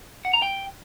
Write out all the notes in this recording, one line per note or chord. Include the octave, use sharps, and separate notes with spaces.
F#5
A#5
G5